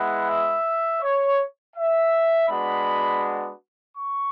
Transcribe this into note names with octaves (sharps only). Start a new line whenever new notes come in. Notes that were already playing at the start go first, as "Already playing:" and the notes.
Already playing: G#3 B3 E4 F#5
E5
C#5
E5
G#3 B3 D4 F#4 B5
C#6